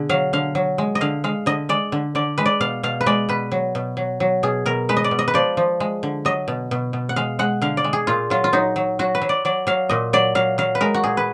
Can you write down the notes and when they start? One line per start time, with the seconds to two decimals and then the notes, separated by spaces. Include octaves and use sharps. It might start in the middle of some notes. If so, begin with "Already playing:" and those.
Already playing: B2 D3 G#4
0.09 F#3 F5
0.33 D3 F5
0.55 F#3
0.78 G#3
0.95 D#5
1.01 D3 F5
1.24 G#3 F5
1.46 D3 D#5
1.69 G#3 D5
1.92 D3
2.15 D3 D5
2.38 G#3 B4
2.46 D5
2.60 B2 F5
2.83 B2 F5
3.01 B4
3.06 G#3 D5
3.29 B2 B4
3.51 F#3
3.75 B2
3.97 F#3
4.20 F#3
4.43 B2 G#4
4.66 B2 A#4
4.89 G#3 B4
4.97 D#5
5.04 D5
5.11 B2
5.19 D#5
5.28 B4
5.34 F3 D5
5.57 F3
5.80 G#3
6.03 D3
6.25 F#3 D#5
6.48 B2
6.71 B2
6.93 B2
7.09 F#5
7.16 G#3 F5
7.39 G#3 F#5
7.62 D3 F5
7.77 D5
7.84 G#3
7.93 G#4
8.07 A#2 F4
8.30 F#3 F4
8.44 F4
8.53 F#3 D#4
8.76 F#3
8.99 F#3 F#4
9.15 B4
9.22 F#3
9.29 D5
9.45 F#3 D5
9.67 F#3 F5
9.89 A#2 D#5
10.13 F#3 D5
10.35 F#3 F5
10.58 F#3 F5
10.75 B4
10.81 G#3 A#4
10.94 F#4
11.04 A#2 G#4
11.17 B4